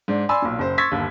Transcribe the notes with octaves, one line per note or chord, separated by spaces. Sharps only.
G#2 D4
D5 G#5 B5 C6 E6
B1 A#2
F#1 C5
C6 C#6 E6 G#6 A6 B6
G1 D#2